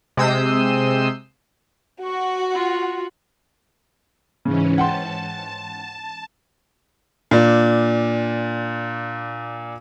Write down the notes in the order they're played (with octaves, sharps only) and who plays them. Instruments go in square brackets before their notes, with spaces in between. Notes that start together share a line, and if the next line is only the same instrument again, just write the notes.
[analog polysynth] C3 G#3 D#6 E6 G6 C7
[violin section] F#4 [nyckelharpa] C#6
[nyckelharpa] F4
[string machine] G#2 E3 C#4 [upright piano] C#3
[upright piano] F#5 G5 C6 [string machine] A5
[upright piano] A#2 D4